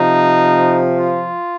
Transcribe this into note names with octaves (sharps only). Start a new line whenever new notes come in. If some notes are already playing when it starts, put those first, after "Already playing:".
Already playing: C3 F3 D#4
F4